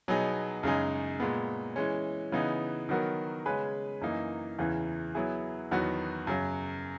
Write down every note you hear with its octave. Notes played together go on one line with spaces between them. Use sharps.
B2 F#3 B3 D#4 G#4
F#2 C#3 G#3 D#4 G#4
A#2 G#3 B3
E3 G#3 C#4
C#3 E3 B3 D#4
D#3 F#3 B3 F#4 A#4
C#3 G#3 C#4 G#4 B4
F#2 E3 A#3 D#4
E2 C#3 E3
F#3 B3 E4 G#4
E2 D#3 F#3 B3 F#4
F#2 C#3 F#3